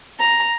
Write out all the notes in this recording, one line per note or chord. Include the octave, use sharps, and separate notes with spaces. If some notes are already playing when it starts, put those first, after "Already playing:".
A#5